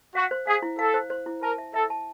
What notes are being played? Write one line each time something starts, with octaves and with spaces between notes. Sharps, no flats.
F#4 F5
C5
G#4 F5
E4
A4 F5
C5
C5
E4
A#4 A5
E5
A4 E5
A5